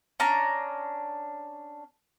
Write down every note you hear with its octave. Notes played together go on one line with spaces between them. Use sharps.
C#4 D4 A#5